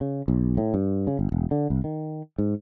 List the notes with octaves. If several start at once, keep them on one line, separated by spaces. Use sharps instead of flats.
C#3
B1
A2
G2
C#3
G1
E1
D3
C2
D#3
G#2